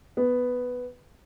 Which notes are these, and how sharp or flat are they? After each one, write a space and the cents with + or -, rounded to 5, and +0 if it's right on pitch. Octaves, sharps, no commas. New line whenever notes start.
B3 +5